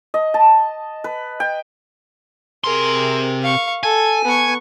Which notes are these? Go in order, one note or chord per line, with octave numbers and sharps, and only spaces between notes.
D#5
A5
B4
G5
C3 G#4 A#4 C6
F5 C#6
A4 G#5
B3 C#6